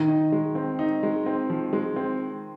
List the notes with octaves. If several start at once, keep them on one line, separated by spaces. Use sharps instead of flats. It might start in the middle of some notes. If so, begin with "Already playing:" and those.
Already playing: D#3
D#4
G#3
C4
D#4
G#3
C4
F3
G#3
C4